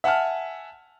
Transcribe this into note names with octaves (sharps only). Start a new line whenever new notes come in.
E5 F#5 G#5 A5 F6